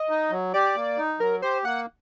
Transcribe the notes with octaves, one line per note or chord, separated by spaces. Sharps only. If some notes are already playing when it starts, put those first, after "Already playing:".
Already playing: D#5
D#4
F#3
G4 D5
A#3
D#4
F#3 A#4
G4 C5
A#3 F#5